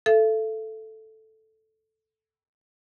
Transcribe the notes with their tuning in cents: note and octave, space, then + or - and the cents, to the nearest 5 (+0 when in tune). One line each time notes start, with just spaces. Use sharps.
A4 +0 E5 +40